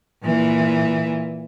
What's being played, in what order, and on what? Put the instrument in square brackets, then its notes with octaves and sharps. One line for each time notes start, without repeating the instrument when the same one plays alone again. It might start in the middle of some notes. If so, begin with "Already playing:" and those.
[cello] A#2 E3